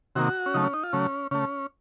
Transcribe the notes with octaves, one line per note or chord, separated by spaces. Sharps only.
C3 D#3 A#3 F#4
C#4
C#3 F#3 A3 D#4
C#4
D#4
F4
C#3 F#3 A3 C#4
C#3 A3 C#4